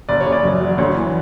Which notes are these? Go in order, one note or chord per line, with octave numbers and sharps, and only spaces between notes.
F#1 D5
C#5
C#3
D5
F#2
F#3
D2 C#5
E3